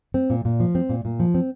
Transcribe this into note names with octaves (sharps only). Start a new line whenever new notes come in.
C4
A#2
A#2
F3
C4
A#2
A#2
F3
C4